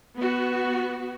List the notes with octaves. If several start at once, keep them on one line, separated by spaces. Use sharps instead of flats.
B3 F#4